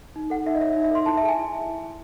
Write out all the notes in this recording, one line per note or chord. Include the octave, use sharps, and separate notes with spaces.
D#4
A4 F#5
D#4 E5
D#5
C#5 E5
E5
D#4
E5
A4 C6
E4 A5
E5
G#4 A5
G#5
E4